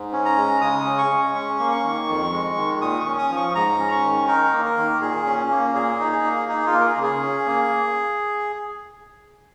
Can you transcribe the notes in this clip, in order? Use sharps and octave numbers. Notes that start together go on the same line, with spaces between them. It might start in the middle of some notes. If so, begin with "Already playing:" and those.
Already playing: G#2
C#4
A#5
G#3
C#3 D#6
C#4
C#6
G#3
C#4 C#6
A#3
C#6
D#3
F2
G#3
D#3
A#2 D#6
C#6
C#4
D#6
F3
C#6
G#2 A#5
C#4
C#6
D#3
D#4 A#4
A#3
A#4
D#3
A#2 G#4
C#4
A#3
A#2 G#4
D#4
G#4
A#3
D#4 G#4
F4
A#3
A#4
G#4
C#3
G#4
C#4
A#3